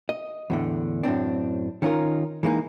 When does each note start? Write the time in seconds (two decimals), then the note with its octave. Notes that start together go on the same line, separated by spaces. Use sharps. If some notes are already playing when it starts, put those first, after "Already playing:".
0.09 D#5
0.50 E2 A2 D3
1.03 F#2 A2 C4 D4
1.82 D#3 C#4 D#4 F4 A#4
2.43 E3 G#3 A#3 D4 D#4